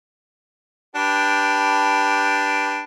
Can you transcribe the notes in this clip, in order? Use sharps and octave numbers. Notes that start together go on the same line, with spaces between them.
D4 G4 B4